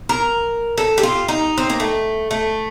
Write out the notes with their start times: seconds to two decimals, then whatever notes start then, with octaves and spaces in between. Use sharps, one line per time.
0.09 A#4
0.78 A4
0.98 G4
1.03 F4
1.28 D#4
1.58 C4
1.70 A#3
1.80 A3
2.31 A3